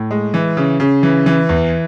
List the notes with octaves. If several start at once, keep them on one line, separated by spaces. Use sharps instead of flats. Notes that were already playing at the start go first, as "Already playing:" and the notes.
Already playing: A2
G#3
E3
C#3
C#3
E3
E3
E2